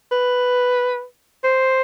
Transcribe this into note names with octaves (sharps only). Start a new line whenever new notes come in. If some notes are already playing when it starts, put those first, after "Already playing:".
B4
C5